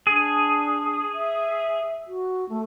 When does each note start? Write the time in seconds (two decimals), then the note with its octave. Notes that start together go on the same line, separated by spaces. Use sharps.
0.07 D4 G#4
1.14 E5
2.07 F#4
2.49 A3